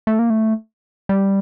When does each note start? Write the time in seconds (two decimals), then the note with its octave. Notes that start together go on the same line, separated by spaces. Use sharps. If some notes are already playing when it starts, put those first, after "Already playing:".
0.07 A3
0.19 A#3
0.30 A3
1.09 G3